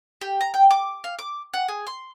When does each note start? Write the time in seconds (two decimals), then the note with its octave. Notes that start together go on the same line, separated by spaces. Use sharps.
0.21 G4
0.41 A#5
0.54 G5
0.71 D6
1.04 F5
1.19 D6
1.54 F#5
1.68 G#4
1.87 C6